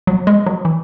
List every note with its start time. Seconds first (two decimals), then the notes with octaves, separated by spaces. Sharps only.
0.07 F#3
0.27 G#3
0.47 F#3
0.65 E3